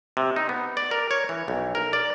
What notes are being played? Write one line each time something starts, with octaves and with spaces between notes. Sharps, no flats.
C3
D#4
B3
D5
A#4
C#5
E3
B1
A#4
D5